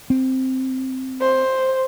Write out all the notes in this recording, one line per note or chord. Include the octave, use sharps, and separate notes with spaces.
C4
C5